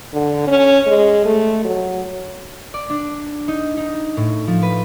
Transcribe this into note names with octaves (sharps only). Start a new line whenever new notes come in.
D3
C#4
G#3
A3
F#3
D5
D4
D#4
D#4
A2
F3
B4